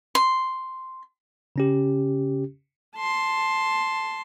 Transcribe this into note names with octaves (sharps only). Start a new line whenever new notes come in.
C6
C#3 C#4 G4
A5 C6